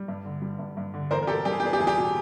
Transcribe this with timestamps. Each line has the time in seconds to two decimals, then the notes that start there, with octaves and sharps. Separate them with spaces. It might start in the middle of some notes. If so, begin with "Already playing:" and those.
Already playing: G3
0.08 G2
0.25 D3
0.42 G3
0.59 G2
0.77 G2
0.94 D3
1.11 E2 A#4 C5
1.22 A#4
1.27 B2 G4 A4
1.45 G3 G4
1.52 G#4
1.60 G4
1.63 B3 G#4
1.73 G4
1.79 E2 G#4
1.87 G4
1.97 B2